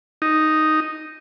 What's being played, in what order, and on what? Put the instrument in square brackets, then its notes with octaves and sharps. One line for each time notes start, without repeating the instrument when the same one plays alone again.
[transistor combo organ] D#4